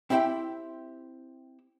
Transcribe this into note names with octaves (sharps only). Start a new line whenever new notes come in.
C4 E4 G4 E5 G5